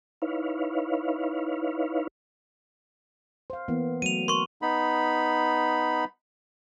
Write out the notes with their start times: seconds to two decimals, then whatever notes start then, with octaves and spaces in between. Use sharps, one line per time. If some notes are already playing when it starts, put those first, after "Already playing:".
0.22 D#4 E4 B4 C#5 F5
3.50 C5 F5
3.68 E3 A#3 B3
4.02 F#3 A3 D#7 F7
4.28 A#4 C6 C#6
4.62 B3 D#4 B5